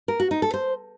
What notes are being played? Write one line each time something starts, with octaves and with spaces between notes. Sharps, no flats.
A#4
F#4
D#4
A4
C5